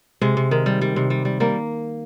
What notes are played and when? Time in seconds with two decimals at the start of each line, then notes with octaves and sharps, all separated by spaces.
0.21 C3 G#3
0.37 C3
0.51 D#3
0.66 G3
0.81 G3
0.96 C3
1.10 G3
1.25 G3
1.40 G3 A#3